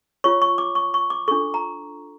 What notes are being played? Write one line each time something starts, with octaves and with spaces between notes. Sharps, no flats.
F4 C#5 C#6
C#6
D6
C#6
C#6
D6
D4 F4 A4 C#6
A#5